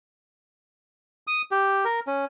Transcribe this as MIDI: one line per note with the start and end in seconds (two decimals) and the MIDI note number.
1.27 1.42 87
1.51 1.85 67
1.85 2.00 70
2.07 2.25 61